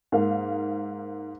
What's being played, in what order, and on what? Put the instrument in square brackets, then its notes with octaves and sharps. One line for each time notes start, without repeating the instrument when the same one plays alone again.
[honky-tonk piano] G#2 A#3 F5